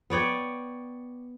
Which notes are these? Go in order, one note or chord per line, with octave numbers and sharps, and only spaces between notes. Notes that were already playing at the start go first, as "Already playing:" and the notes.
B3 C#5 D5 G5